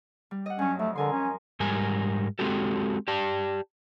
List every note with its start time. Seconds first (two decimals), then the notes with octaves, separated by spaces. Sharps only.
0.31 G3
0.46 D#5 F#5
0.59 G2 F#3 C#4
0.79 F2 A3
0.96 D3 A#4 G#5 C6
1.12 C#4
1.60 G#2 G3 A#4 G#5
2.39 G#3 C4 F#4 G4 A4
3.08 G4 D5 A5